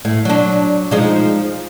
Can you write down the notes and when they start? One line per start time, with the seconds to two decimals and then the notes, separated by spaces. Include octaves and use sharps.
0.05 A2
0.25 F#3 D4
0.91 F3 G#3 D#4